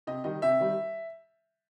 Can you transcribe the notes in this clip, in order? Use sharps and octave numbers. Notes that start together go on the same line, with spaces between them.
C3 D#5
D#3 G3 D#5
C3 E5
D#3 G3